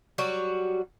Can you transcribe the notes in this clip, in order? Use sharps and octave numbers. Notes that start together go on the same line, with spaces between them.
F#3 G3 F#4